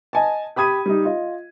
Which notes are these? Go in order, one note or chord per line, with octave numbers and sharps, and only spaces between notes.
D#5 G#5 A5
G4 B5 D#6 G#6 D#7
G3 D#4
F4 D#5